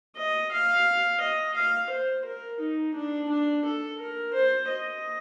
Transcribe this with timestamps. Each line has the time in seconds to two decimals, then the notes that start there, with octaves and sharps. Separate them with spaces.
0.16 D#5
0.52 F5
1.21 D#5
1.55 F5
1.90 C5
2.25 A#4
2.60 D#4
2.94 D4
3.29 D4
3.65 A4
4.00 A#4
4.33 C5
4.69 D#5